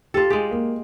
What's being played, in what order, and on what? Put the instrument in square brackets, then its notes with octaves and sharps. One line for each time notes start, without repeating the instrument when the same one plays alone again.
[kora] F4 A4 [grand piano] G4
[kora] G#3 G4 [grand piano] G#4
[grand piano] A#3